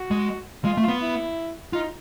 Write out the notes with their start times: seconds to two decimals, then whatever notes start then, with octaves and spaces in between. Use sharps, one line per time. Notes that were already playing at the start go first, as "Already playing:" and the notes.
Already playing: F#4
0.11 G#3
0.65 G#3 F4
0.77 A3
0.83 F4
0.88 B3
1.02 E4
1.73 D#4 F4